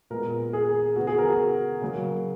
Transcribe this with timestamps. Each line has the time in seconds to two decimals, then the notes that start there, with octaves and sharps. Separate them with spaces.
0.10 A#2 G#3 B3 A#4
0.53 G#4
0.96 C#3 E3 B3 F#4
1.07 G#4
1.18 A#4
1.29 F#4
1.82 C#3 F#3 A#3